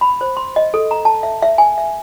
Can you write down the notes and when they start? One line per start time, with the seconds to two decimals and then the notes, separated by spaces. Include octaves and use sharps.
0.01 B5
0.21 C5
0.37 C6
0.56 D#5
0.74 A4
0.91 A#5
1.05 A5
1.23 E5
1.42 E5
1.58 G#5
1.78 E5